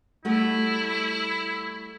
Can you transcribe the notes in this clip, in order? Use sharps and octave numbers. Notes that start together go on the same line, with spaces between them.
G3 A3 E4 F#4